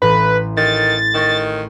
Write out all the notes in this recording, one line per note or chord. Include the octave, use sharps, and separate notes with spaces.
A1 A2 B4
D#3 A6
D#3 D#5 C#6